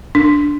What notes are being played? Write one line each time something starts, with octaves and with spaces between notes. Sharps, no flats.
D4